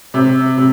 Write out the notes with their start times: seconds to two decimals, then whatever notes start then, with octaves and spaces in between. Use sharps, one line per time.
0.14 C3
0.57 C3